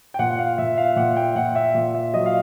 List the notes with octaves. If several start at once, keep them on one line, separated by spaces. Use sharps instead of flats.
G5
A#2 F#5
F#5
F5
A#2 E5
F5
A#2 F#5
G5
A#2 F#5
E5
A#2
E5
F#3 D#5
F5